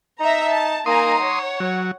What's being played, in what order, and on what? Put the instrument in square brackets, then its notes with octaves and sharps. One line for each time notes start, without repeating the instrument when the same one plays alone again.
[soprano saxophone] D#4 [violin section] E5 A#5
[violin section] A5
[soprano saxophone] A#3 [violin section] D#4 G#5 A#5 [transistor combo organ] C6 D#6
[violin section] C#5 [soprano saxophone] F#5
[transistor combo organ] F#3